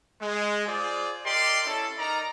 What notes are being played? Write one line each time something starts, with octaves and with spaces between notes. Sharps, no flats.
G#3
F4 G#4 C5 D5
G4 A#4 D5 D#5 C6
C#4 E4 A4
D#4 A#4 D5 A#5